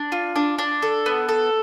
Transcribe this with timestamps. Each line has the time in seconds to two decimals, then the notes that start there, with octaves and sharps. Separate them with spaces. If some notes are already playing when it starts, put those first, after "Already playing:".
Already playing: D4
0.12 F4
0.36 D4
0.58 D4
0.82 A4
1.06 B3
1.29 A4